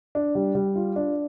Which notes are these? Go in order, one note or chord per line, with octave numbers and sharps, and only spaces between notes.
D4
G3
G3
F4
D4